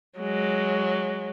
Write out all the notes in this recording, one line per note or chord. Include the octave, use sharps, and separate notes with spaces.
F#3 G#3